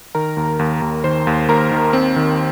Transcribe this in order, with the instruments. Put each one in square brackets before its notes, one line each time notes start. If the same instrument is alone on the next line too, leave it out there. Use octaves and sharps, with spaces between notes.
[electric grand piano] D#3 A#4 A#5
D#2
D#2
D#2
D#3 C5 C6
D#2
D#2 A#4 A#5
D#3
C4
D#3